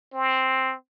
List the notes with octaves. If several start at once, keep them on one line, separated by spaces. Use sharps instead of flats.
C4